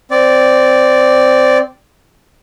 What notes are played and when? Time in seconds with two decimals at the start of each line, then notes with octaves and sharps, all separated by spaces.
0.11 C4 D5